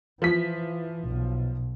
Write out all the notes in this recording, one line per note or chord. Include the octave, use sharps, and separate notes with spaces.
E3 F3 B6
B1 B2